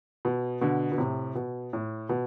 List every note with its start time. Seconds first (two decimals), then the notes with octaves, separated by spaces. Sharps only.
0.25 B2
0.61 B2 D3
0.92 B2
0.98 A2 C3
1.35 B2
1.73 A2
2.09 B2